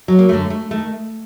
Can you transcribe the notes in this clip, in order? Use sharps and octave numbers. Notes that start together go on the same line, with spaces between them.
F#3
A#3
F#2 D3 A3
A3
D#3 A3